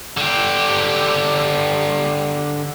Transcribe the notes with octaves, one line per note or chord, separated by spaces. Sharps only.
D3 G4